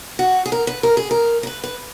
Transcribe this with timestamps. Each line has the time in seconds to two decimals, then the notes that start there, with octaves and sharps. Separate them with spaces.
0.19 F#4
0.46 G#4
0.52 A#4
0.67 B4
0.83 A#4
0.97 G#4
1.11 A#4
1.43 A#4
1.47 B4
1.64 B4